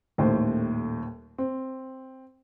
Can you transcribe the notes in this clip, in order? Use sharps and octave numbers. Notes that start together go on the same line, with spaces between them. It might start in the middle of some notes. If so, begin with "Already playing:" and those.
D#1 D#2 A2 C5
C4